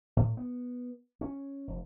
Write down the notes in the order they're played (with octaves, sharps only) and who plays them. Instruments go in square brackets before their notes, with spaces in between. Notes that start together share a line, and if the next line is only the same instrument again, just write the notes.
[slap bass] A2
B3
C#4
F1